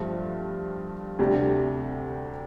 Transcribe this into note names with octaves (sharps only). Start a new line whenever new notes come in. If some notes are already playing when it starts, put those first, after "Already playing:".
Already playing: G2 F3 A3
D2 C3 G3 D4